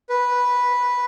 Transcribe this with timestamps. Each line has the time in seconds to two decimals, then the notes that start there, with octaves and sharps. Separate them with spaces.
0.10 B4